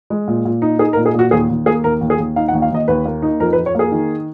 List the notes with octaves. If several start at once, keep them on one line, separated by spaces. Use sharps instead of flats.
G#3
A#2
A#2
D#4
D#4 G#4
A#4
A#2
G#4
A#2 F#4
D#2 G#4
D#2
A#3 G#4
D#2 A#4
D#2
G#4
D#2
D#4 F5
F#5
D#2
F5
D#2 D#5
D#2 B4
A#3
D#4
F2 A#4
B4
F2
C#5
A#3 G#4
D#3